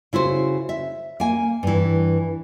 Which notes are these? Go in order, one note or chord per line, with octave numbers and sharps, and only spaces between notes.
C#3 E4 F#4 C5
E5
A#3 G#5
G2 E3